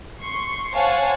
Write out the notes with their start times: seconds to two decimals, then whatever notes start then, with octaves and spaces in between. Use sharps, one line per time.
0.21 C6 C#6 C7
0.74 C5 C#5 F5 F#5 G#5 A5